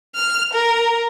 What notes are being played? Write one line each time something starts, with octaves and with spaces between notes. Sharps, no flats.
F6
A#4